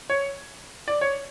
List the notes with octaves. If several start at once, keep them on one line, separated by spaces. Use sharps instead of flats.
C#5
D5
C#5